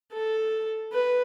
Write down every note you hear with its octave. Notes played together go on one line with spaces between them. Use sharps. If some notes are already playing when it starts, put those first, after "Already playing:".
A4
B4